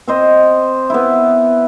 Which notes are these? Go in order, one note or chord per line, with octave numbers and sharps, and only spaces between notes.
C4 C5 D#5
B3 E4